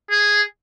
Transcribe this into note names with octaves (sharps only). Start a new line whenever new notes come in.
G#4